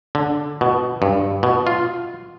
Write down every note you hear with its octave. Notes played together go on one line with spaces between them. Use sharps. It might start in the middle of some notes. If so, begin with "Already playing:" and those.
D3
B2
G2
B2
F4